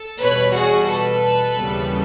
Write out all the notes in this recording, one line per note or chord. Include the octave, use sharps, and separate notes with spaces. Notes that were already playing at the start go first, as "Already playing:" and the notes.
Already playing: A4
E2 B2 G3 B4 C#5
F#4 G#4
A4 B4
D#2 C#3 E3 G3 B3